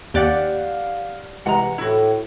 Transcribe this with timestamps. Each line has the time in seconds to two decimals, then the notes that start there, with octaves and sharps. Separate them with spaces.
0.14 D#2 G4 D5 F5 F#5 D6 F#6
1.46 C3 E3 G#3 F#5 A#5
1.78 A2 E4 F#4